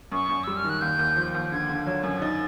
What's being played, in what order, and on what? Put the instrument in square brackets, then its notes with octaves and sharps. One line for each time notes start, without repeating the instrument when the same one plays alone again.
[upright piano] F#2 [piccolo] C#6
[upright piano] F#2
[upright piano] G3 [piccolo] E6
[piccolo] F6
[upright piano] D#3 [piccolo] F#6
[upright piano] D#2 [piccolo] G6
[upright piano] D#2
F3
D#2
[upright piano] D3 [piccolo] G#6
[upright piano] D3
F#3
F#2
[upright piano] D#4 [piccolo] A6